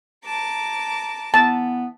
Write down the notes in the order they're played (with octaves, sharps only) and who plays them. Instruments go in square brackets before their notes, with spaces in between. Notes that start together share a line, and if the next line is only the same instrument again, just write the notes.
[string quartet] A5 A#5 D6
[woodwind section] E3 B3 [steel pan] A5